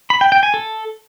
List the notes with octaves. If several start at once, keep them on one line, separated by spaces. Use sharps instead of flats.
B5
G5
G5
G#5
A4